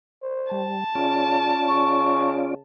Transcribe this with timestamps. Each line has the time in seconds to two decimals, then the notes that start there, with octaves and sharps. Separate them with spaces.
0.22 C5
0.51 G3 A5
0.95 C#3 C#4 F4 D5
1.68 C#3 C#6